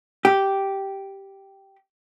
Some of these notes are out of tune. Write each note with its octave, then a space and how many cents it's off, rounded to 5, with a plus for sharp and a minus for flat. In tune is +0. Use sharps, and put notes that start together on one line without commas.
G4 -5